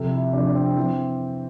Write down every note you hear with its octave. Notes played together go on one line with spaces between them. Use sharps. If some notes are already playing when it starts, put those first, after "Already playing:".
Already playing: C3 F3 A4
E4
C3 F3 D4
D4
C4
E3 C4